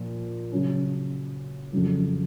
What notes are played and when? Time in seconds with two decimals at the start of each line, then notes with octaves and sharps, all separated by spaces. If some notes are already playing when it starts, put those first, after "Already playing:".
Already playing: A#2 F3
0.52 C#3 F#3 C#4
1.72 F2 C#3 F#3